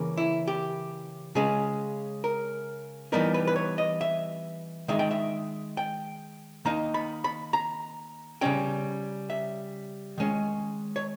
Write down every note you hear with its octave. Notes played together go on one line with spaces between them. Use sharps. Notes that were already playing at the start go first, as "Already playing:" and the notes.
Already playing: C#3 E3 A#3 C#4
E4
G4
C#3 G#3 C#4 G#4
A#4
E3 G3 B3 D#4 A#4
B4
B4
C#5
D#5
E5
D#3 G#3 D#4 E5
G5
E5
G5
D#3 A#3 D#4 A#5
B5
B5
A#5
C#3 G3 C#4 G5
E5
D#3 G#3 C#4
C#5